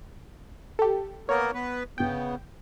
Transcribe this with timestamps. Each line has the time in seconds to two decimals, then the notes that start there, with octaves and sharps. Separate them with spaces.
0.79 G4 A4
1.29 A#3 B3 A#4 C#5
1.54 B3 B4
1.98 G1 C#3 B3 G5